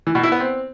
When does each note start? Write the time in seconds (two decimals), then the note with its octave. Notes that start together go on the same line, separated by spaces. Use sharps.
0.07 E3
0.15 B2
0.23 E4
0.32 B3
0.40 C4